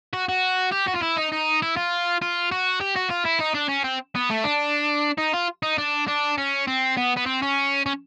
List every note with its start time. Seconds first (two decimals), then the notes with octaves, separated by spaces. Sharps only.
0.13 F#4
0.29 F#4
0.72 G4
0.88 F#4
0.96 F4
1.03 E4
1.18 D#4
1.33 D#4
1.62 E4
1.76 F4
2.22 F4
2.51 F#4
2.81 G4
2.96 F#4
3.10 F4
3.26 E4
3.40 D#4
3.55 D4
3.69 C#4
3.84 C4
4.15 B3
4.30 A3
4.44 D4
5.18 D#4
5.34 F4
5.63 D#4
5.78 D4
6.08 D4
6.38 C#4
6.67 C4
6.97 B3
7.17 B3
7.26 C4
7.42 C#4
7.86 C#4